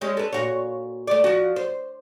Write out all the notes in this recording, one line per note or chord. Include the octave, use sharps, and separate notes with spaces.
G3 G#3 C#4
A4 B4
A#2 F#4 C#5
A3 D5
F3 F#4
C5